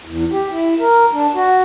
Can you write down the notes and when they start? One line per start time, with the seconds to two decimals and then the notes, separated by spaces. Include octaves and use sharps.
0.05 E2
0.32 G4
0.51 E4
0.80 A#4
1.13 D4
1.35 F#4